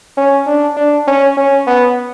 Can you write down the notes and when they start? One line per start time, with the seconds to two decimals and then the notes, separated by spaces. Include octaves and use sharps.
0.17 C#4
0.47 D4
0.77 D4
1.07 C#4
1.37 C#4
1.67 B3